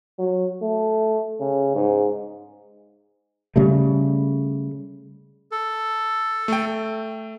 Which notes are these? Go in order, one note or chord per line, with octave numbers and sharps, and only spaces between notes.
F#3
A3
C#3
G#2
C#3 G3 A3
A4
A3 G5